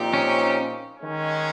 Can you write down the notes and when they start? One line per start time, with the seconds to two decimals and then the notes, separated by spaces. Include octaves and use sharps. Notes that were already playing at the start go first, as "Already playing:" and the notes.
Already playing: A#2 F3 C4 D#4 G4
0.14 C#4
0.98 D#3 G#3 C#4